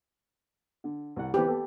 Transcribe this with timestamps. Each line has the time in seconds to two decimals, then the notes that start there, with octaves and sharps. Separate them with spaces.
0.84 D3
1.16 C2 F#5
1.34 E3 B3 C4 G4
1.47 B3 A4